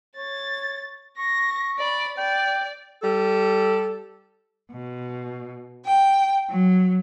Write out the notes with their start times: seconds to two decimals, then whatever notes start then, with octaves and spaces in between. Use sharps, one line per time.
0.17 C#5 A6
1.18 C#6 A#6
1.79 D5 B5
2.18 D5 G5
3.02 G3 A4
4.73 B2
5.85 G5
6.50 F#3